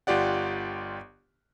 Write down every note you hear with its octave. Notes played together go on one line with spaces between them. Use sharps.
G1 F4 G4 D5 F#5